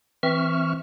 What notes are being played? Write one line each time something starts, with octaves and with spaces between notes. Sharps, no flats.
E3 C4 E5 C#6 F6